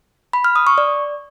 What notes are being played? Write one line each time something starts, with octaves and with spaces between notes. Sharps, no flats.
B5
F6
D#6
C#6
D5